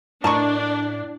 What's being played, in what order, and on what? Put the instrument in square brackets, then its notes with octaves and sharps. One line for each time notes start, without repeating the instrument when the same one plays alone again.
[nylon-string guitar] A2 [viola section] D4 [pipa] A#4 D#5 C#6 [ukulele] A5